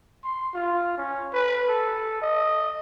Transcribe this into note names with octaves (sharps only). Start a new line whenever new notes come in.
C6
F4
C#4
B4
A4
D#5